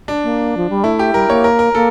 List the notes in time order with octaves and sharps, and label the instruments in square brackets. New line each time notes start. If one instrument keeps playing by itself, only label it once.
[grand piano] D4
[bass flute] A#3
F3
G3
[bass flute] A3 [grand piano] E4
[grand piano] G4
[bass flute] G3 [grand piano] A#4
[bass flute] A#3 [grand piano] C#5
[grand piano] A#4
A#4
[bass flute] A#3 [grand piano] A4